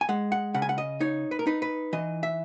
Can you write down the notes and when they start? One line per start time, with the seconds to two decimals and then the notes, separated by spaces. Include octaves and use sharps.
0.01 G#5
0.09 G#3 F#5
0.32 F#5
0.54 C#3 F#5
0.62 G#5
0.69 F#5
0.78 D#5
1.00 D#4 C#5
1.31 B4
1.39 A#4
1.47 D#4 B4
1.62 B4
1.93 E3 D#5
2.23 E5